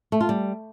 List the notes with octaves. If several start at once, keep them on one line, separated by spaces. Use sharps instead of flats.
A3
F4
G3